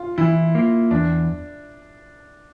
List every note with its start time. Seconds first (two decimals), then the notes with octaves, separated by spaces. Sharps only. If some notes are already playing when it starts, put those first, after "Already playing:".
Already playing: F4
0.18 E3 E4
0.55 A#3 F4
0.91 E2 D4